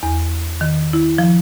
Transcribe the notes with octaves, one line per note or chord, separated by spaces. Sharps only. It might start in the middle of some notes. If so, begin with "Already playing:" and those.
E2
D#3
E4
F3